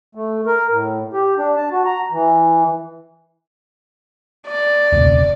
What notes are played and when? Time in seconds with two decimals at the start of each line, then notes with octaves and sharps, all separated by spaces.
0.15 A3
0.46 A#4
0.71 A2
1.13 G4
1.38 D4
1.56 A5
1.72 F#4
1.85 A#5
2.12 E3
4.47 D5
4.92 E1 C#2